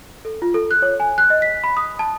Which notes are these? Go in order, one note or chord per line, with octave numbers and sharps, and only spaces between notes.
A4
F4
A4
F#6
C#5
G#5
F#6
D#5
B6
B5
D#6
A5